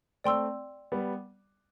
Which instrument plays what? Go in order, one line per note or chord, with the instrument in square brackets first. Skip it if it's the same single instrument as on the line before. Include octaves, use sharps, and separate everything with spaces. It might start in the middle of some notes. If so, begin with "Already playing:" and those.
[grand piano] A3 C4 [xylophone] D5 G5 C6 E6
[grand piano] G3 B3